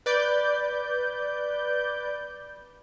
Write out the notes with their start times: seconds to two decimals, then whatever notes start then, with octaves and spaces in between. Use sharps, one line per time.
0.06 B4 D5 G6